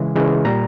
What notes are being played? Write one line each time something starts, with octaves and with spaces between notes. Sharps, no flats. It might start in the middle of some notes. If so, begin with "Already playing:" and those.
Already playing: C#3 E3 G#3
C#3 E3 G#3
A#2 G3 A#5